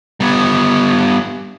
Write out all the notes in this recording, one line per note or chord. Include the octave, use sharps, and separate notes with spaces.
G3 B3